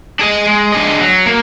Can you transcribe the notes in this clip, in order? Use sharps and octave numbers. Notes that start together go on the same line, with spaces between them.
D4 G#4 D#5
G#3
D4 G#4 D#5
F#3
A#3